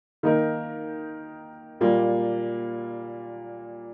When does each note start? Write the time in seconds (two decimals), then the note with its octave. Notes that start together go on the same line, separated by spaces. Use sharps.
0.23 D#3 A#3 D#4 A#4
1.81 A#2 G3 A#3 F4